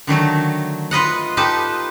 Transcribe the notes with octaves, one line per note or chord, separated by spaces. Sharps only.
D3 D#3 F#3 A3
F4 B4 D#5 F#5
D#4 F4 G4 A4 B4 A5